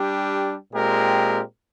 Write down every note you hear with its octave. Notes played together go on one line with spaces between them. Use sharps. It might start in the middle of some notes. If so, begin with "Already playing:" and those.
Already playing: G3 D4 G4
A#2 G#3 C4 G4 A#4